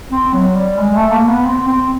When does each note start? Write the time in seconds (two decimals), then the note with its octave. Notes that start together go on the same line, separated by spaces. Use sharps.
0.11 C4
0.33 F#3
0.56 G3
0.78 G#3
0.95 A3
1.11 A#3
1.28 B3
1.45 C4
1.67 C4